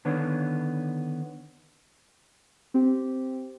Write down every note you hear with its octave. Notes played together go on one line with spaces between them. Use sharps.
D3 D#3 B3 D4 C#5
C4 G4